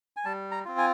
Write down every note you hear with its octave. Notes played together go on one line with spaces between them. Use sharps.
G#5
G3 A5
A#5
C4 F4
G#5